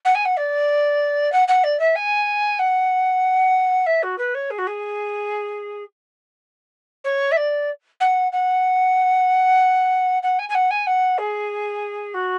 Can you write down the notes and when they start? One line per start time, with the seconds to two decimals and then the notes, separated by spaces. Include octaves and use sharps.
0.05 F#5
0.15 G#5
0.25 F#5
0.37 D5
1.32 F#5
1.48 F#5
1.64 D5
1.79 E5
1.95 G#5
2.59 F#5
3.86 E5
4.03 F#4
4.18 B4
4.34 C#5
4.50 G#4
4.58 F#4
4.67 G#4
7.04 C#5
7.31 E5
7.37 D5
8.00 F#5
8.32 F#5
10.23 F#5
10.39 G#5
10.49 G#5
10.54 F#5
10.70 G#5
10.87 F#5
11.18 G#4
12.14 F#4